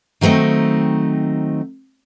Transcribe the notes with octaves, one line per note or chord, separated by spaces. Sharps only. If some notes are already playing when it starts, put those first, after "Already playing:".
D#3 F#3 A3 C4 D#4